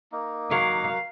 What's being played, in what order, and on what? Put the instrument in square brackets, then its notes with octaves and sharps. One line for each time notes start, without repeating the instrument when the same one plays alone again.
[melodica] A#3 D#4
[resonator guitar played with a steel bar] F#3 A#4 [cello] F5